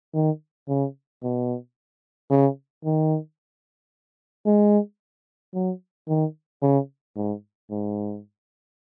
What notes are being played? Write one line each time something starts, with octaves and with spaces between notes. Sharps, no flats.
D#3
C#3
B2
C#3
D#3
G#3
F#3
D#3
C#3
G#2
G#2